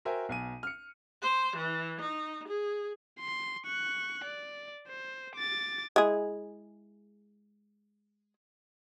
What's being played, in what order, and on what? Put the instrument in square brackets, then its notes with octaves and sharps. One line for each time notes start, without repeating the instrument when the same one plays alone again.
[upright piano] F#4 A#4 C5 E5 G5 G#5
B1 G#5 D#7
F6 C#7
[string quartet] C5
E3
D#4
G#4
[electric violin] C6
C#6 F#6
D5
C5
D6 A6
[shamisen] G#3 E4 G#4